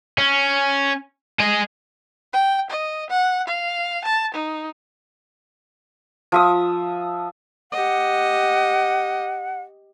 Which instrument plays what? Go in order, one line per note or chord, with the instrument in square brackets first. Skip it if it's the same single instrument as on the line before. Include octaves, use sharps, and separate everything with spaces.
[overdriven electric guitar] C#4
G#4 D#5
[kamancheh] G5
D#5
F#5
F5
A5
D#4
[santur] F3 E5 D#6
[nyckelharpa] G4 D#5 [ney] F#5